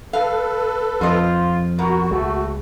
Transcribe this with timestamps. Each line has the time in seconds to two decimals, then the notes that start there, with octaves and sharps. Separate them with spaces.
0.13 A4 B4 F5
1.01 F2 F4 C5 D#5
1.79 B2 F#4 A#4
2.11 C#2 G#3 A3